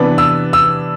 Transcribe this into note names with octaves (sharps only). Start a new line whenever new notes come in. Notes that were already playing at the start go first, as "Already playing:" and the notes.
Already playing: C3 E3 B3 D4
E6
E6